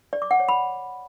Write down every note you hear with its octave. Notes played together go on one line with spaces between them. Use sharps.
D5
D6
F#5
C#5
B5